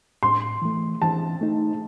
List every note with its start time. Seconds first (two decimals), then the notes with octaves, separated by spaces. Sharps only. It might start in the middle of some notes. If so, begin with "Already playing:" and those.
0.23 A2 C6
0.62 E3 A3
1.02 E3 A5
1.41 A3 D#4